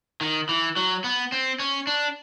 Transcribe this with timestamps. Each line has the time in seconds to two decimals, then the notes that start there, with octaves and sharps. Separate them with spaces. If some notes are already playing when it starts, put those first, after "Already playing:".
0.21 D#3
0.49 E3
0.77 F#3
1.04 B3
1.32 C4
1.60 C#4
1.87 D4